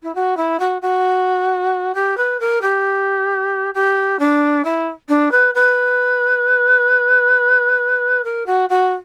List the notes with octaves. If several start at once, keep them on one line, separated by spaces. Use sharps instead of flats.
E4
F#4
E4
F#4
F#4
G4
B4
A#4
G4
G4
D4
E4
D4
B4
B4
A#4
F#4
F#4